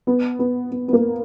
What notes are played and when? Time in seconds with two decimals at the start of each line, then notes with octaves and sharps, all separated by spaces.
0.07 B3
0.39 B3
0.71 B3
0.88 B3
0.93 A#3